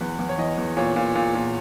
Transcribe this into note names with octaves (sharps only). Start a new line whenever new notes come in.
E2 B4
E2
C#5
E3 D#5
E2
A#2 C#5
A#2
A#2
A#2